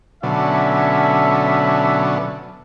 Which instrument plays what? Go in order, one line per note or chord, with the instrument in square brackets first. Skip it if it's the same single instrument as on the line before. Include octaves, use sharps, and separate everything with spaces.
[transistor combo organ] B2 D3 F#3 [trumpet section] C#4 A4 E5